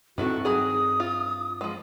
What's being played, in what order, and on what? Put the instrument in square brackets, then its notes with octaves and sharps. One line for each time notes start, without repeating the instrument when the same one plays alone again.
[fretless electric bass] G2 C4 [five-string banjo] D#3 E4 A4 [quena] F#4
[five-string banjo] D#3 F#3 G#4 [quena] D#6
[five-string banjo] F4
F3 G#3